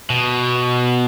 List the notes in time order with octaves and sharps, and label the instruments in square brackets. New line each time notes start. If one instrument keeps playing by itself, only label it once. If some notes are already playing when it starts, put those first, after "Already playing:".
[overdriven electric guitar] B2